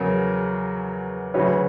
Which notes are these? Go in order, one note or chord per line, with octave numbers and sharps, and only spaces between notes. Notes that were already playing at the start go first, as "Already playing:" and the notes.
Already playing: E2 C#3 F#3 A#4
D2 C#3 F#3 B4 C#5